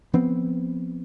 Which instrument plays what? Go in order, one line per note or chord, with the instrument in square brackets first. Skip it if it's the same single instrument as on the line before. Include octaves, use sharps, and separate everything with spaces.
[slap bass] F3 B3 C4